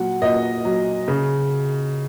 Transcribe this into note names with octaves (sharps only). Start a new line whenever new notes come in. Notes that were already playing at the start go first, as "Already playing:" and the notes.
Already playing: A#2 F#3 F#5
A#2 D#5
F#3
C#3